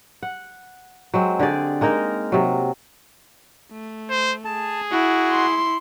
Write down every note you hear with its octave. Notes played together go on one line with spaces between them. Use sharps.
F#5
F#3 G#3 C4
D3 G4 G#4 D5
G#3 A#3 D#4 A#4
C3 F#3
A3
C5
G#4 A5
E4 F#4
C6